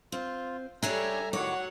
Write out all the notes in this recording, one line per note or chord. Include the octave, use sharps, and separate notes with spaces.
C4 F4
G3 D4 G#4 A4 C#5 E5 G#5 A#5
A2 D#3 F#3 C#5 F#5 D6